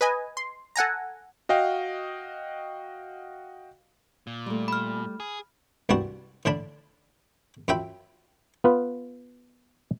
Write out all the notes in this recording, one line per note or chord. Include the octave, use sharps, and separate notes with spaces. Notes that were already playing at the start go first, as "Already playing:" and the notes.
B4 D#5 G#5
C6
A4 F#5 G#5 A#5
F#4 D#5 F5 G5
A#2
G3 A3
B5 F6
G#4
C2 G2 G3 F#4 A5
A2 D3 D4 A5 B5
F#2 F4 E5 G5 B5
B3 F4 B4